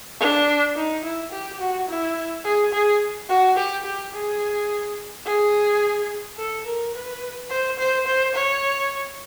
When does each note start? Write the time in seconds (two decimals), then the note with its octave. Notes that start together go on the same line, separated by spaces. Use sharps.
0.20 D4
0.76 D#4
1.04 E4
1.32 G4
1.60 F#4
1.88 E4
2.44 G#4
2.73 G#4
3.29 F#4
3.57 G4
3.85 G4
4.13 G#4
5.26 G#4
6.38 A4
6.66 A#4
6.94 B4
7.50 C5
7.79 C5
8.06 C5
8.35 C#5